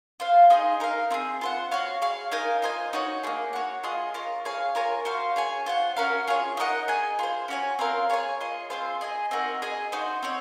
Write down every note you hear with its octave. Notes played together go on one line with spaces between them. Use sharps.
F4 C5 F5
D#4 G#4 C5 D#5
D#4 A#4 F5
C4 F4 G#4
F4 C5 F#5
F#4 C#5 F5
G#4 C#5 F5
D#4 A#4 F5 G#5
F4 C5 D#5 G#5
D#4 F#4 C#5
A#3 F4 G#4
F#4 C#5 F#5
F4 G#4 D#5
F4 A#4 C#5
G#4 C#5 F5 G#5
F4 A#4 C#5 G#5
F#4 C5 F5
G#4 C#5 G#5
F4 C5 F#5
C#4 F#4 A#4 F5
F4 G#4 C#5
D#4 A#4 D#5 F#5
G#4 D#5 G#5
F4 G#4 C5
C#4 F#4 C#5 G#5
C4 F4 A#4 F5
G#4 C#5 F5 G#5
F4 G#4 D#5
C4 F4 G#4 C5
G#4 D#5 G#5
C4 D#4 F#4 A#4
G#4 D#5 G#5
D#4 F#4 C5
C4 F#4 C#5